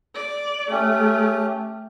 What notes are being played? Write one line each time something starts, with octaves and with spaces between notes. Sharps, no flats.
D5
A3 C#4 G4